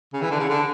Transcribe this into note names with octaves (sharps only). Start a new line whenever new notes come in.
C#3
E3
D3
C#3
D3